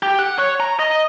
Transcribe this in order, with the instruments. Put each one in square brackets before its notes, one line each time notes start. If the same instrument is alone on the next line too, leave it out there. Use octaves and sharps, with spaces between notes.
[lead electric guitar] G4
F#5
C#5
A#5
D#5